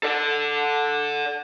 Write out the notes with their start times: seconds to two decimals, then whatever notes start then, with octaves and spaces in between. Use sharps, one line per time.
0.03 A4 D5